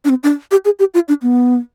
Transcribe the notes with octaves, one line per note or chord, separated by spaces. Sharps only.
D4
C4
D4
G4
G#4
G4
F4
D4
B3